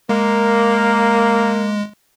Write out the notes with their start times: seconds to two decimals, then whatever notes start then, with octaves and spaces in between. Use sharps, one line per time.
0.09 G#3 A#3